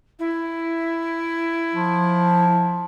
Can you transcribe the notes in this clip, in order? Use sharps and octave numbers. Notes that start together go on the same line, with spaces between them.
E4
F3